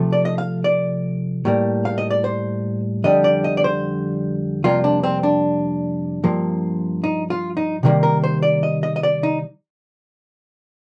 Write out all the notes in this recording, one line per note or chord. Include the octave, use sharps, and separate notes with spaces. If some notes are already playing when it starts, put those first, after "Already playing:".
Already playing: C3 F3 A3
D5
D#5
F5
D5
A2 G3 A#3
F5
D#5
D5
C5
F2 D3 G3 D#5
D5
D#5
D5
C5
F2 C3 G3 A#3 F4
D4
C4
D4
G2 F3 A#3
D#4
F4
D#4
C3 D#3 G3 A#3
A#4
C5
D5
D#5
D#5
D#5
D5
D#4